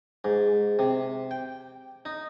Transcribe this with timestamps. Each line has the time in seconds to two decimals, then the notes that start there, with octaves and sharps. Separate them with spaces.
0.25 G#2
0.79 C3
1.31 G5
2.05 D#4